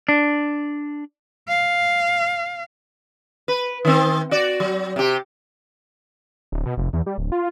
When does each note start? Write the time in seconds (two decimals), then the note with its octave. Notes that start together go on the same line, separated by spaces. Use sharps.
0.09 D4
1.49 F5
3.48 B4
3.85 D#3 C4
4.31 F#4 D5
4.60 F#3
4.96 C3 G4
6.52 D1
6.66 B2
6.77 F1
6.93 E2
7.06 G3
7.18 D1
7.32 F4